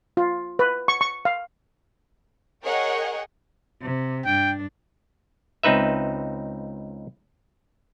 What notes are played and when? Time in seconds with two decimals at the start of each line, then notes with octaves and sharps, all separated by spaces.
0.17 F4
0.59 B4
0.88 C#6
1.01 C#6
1.25 F5
2.64 G#4 A#4 C#5 D#5 F#5 G5
3.82 C3
4.25 G2 D4 G5
5.63 C#2 C4 D#4 B4 E5